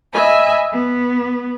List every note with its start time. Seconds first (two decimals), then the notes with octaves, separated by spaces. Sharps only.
0.13 D#5 E5 G#5 B5
0.71 B3